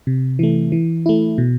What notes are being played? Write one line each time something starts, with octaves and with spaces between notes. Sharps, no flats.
C3
E3 A3
E3
A3 E4
B2